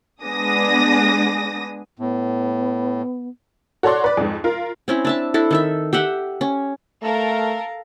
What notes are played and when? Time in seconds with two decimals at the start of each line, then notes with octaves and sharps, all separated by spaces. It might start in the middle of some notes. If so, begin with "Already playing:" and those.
0.22 G#3 B3 D4 G#4 D#6 A#6
1.99 A2 B3
3.83 F#4 A4 C#5 D5 C6
4.04 B4 D5
4.17 F2 G#2
4.44 F4 A#4
4.88 C4 C#4 E4
5.05 D4 E5 A5
5.34 D4 E4 A4
5.51 D#3 A4 E5
5.93 G4 E5 F#5 G5
6.41 C#4
7.02 A3 A4 A#4 F5 A#5